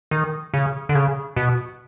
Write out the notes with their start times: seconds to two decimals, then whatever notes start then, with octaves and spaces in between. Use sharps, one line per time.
0.11 D#3
0.54 C#3
0.89 D3
0.95 C#3
1.36 B2